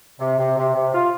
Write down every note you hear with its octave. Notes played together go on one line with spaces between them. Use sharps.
C3
C3
C3
C3
F4